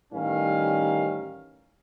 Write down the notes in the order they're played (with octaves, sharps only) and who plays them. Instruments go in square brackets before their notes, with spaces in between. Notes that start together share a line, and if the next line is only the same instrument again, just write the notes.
[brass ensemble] A1 D#3 E3 G3 C#4 F5